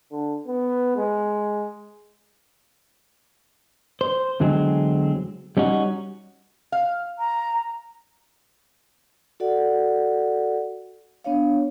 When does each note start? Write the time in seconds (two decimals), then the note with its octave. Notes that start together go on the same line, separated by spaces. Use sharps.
0.12 D3
0.47 B3
0.96 G#3
4.01 C5
4.40 E2 D3 F#3 G#3 C4
5.57 G3 C#4 D#4 F#4
6.72 F5
7.19 A#5
9.40 F#4 A4 D5 F#5
11.24 B3 D4 C#5 F5